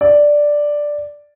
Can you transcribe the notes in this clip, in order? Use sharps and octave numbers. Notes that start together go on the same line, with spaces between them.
D5